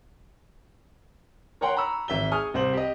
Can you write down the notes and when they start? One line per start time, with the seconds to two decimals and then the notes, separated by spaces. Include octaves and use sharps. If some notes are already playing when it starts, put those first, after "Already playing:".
1.61 A#4 C#5 F#5 G5 C6
1.76 A#5 B5 C#6 E6
2.08 G#1 E5 G7
2.31 G#4 G#5 C#6 D#6 F6
2.54 C2 C5 F#7
2.73 G4 D#5